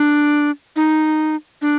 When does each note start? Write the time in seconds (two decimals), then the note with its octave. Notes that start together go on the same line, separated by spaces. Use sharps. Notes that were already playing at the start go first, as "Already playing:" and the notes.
Already playing: D4
0.76 D#4
1.62 D4